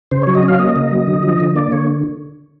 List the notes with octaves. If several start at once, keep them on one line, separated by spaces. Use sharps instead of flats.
C#3 C5
F#3 C#5
D#5
C#4
F5
A#3 D#5
C#3
F#3
D3
F3
D3
A#3 D5
D3 C#5